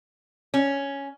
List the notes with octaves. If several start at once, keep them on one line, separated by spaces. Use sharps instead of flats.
C#4